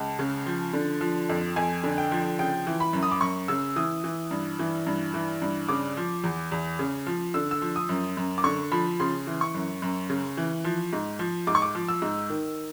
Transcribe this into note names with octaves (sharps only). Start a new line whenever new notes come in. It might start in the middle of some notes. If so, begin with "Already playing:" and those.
Already playing: C#2 A5
C#3
F3
D3
F3
F2
F2 G#5
D3
G5
F3
C#3 G5
E3
B5
F#2
D#6
D6
F#2 C#6
C#3 E6
E3 D#6
E3
G2
E3
G2
E3
G2
C#3 D6
F3
E2
E2
C#3
F3
D3 E6
E6
F3
D#6
F#2
F#2
D6
D3 C#6
F3 B5
C#3 C6
E3
C#6
F#2
F#2
C#3
E3
F3
G#2
F3
G#2 D6
C#6
D6
F3
E6
G#2
D#3